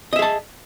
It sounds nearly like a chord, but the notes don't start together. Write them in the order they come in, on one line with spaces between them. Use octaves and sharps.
D#5 E5 G#4 A5